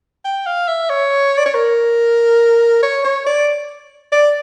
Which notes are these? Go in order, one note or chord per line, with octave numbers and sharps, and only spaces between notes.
G5
F5
E5
C#5
D5
C#5
A#4
C#5
C#5
D5
D5